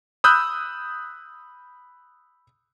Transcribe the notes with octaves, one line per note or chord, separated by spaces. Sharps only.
B5 D#6 E6 F#6 G6